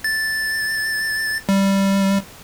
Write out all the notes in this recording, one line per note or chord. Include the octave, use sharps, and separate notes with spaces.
A6
G3